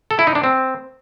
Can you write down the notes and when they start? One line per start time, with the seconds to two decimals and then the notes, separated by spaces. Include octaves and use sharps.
0.11 A4
0.19 E4
0.27 D#4
0.35 D4
0.44 C4